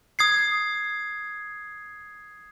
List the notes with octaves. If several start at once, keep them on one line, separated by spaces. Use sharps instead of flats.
D#6 G#6 C7